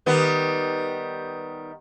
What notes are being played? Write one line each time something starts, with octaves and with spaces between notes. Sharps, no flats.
D#3 G3 B3